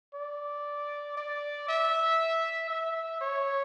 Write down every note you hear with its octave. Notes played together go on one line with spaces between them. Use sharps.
D5
D5
E5
E5
C#5